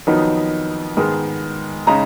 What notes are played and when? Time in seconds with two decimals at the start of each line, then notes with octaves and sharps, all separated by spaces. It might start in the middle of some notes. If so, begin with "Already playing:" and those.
0.07 F2 D#3 F#3 B3 D#4
0.97 G#2 D#3 G#3 B3
1.87 C#3 G#3 D#4 A#5